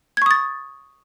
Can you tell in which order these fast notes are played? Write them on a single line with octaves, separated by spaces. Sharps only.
G#6 C#6 D#6 A6